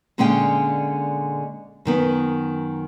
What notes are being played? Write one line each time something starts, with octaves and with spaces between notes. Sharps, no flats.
A#2 D3 G#3 C#4 F5 G5
F#2 D#3 B3